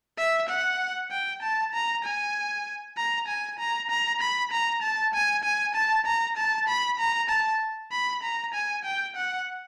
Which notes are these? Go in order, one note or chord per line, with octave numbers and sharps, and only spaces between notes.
E5
F#5
G5
A5
A#5
G#5
A#5
G#5
A#5
A#5
B5
A#5
A5
G#5
G#5
A5
A#5
A5
B5
A#5
A5
B5
A#5
G#5
G5
F#5